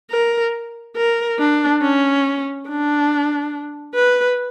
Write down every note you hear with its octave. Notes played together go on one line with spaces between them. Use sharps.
A#4
A#4
D4
C#4
D4
B4